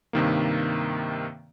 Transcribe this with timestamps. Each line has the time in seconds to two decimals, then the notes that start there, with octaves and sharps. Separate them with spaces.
0.13 G2 C3 D#3 A#3